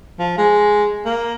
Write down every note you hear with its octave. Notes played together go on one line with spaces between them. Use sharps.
F3
G#3
A#3